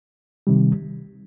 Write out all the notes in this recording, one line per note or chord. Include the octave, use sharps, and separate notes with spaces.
C3 D#3 G3